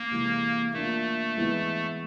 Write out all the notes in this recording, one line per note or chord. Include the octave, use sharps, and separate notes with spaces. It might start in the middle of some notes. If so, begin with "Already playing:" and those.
Already playing: A#3
C3 E3 G#3
A3 A#3 D4 F4
E3 G#3 B3 E4